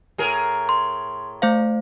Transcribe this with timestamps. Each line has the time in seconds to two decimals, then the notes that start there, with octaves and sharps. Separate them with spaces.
0.18 A2 G#4 A#4
0.69 C6
1.42 A3 C5 F5